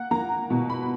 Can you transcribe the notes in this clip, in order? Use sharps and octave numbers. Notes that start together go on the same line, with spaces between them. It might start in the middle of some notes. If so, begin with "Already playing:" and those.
Already playing: A#3 F#5
A#3 A#5
B2
B5